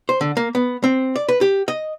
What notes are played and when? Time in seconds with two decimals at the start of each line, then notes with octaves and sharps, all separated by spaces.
0.09 C5
0.21 D3
0.37 A#3
0.55 B3
0.84 C4
1.16 D5
1.29 B4
1.41 G4
1.68 D#5